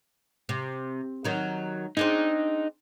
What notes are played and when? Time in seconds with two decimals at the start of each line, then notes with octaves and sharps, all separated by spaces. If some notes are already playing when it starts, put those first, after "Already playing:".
0.49 C3
1.24 D#3 F#3 D#4
1.97 C4 D4 D#4 G#4